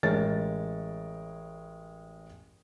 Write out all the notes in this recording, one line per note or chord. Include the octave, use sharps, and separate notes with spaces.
A1 G#3 A#4 C#5 A6